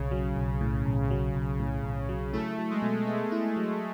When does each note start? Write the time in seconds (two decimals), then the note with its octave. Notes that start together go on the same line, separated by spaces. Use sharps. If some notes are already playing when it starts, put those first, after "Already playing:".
Already playing: B1 C#3
0.11 F#3
0.37 B1
0.61 A2
0.85 B1
1.10 F#3
1.34 B1
1.59 A2
1.84 B1
2.09 F#3
2.33 A3 E4
2.58 F#3
2.70 G#3
2.82 B2
3.06 G#3 B3
3.32 E4
3.56 F#3